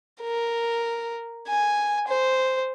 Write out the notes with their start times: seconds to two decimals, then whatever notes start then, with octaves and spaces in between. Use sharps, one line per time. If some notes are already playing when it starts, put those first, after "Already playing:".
0.22 A#4
1.48 G#5
2.08 C5